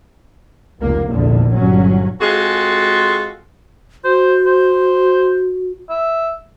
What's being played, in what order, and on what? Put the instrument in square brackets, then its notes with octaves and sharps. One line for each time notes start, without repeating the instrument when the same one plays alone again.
[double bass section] F1 C#2 A#3
F1 A#1 E2 D3
G1 F#3 C#4
[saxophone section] G#3 C4 F4 F#4 G#4 A4
[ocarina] F#4 [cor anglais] C5
[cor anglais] C5
E5